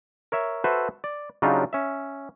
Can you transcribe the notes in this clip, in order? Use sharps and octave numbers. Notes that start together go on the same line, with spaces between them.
A#4 C#5 E5
F#4 A4 B4 C5 E5
D5
C#3 F#3 D4 D#4 F4 G4
C#4 E5